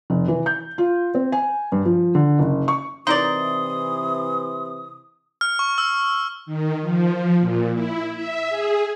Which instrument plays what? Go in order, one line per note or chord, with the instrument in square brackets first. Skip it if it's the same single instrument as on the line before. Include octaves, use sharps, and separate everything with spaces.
[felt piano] F1
E3
G6
F4
C4
G#5
G2
F3
D3
F#1
C#6
[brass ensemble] C3 E3 [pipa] D#4 A#4 D5 [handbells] C6 [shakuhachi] D#6
[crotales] F6
C#6
E6
[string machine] D#3
F3
A#2
E4
E5
G#4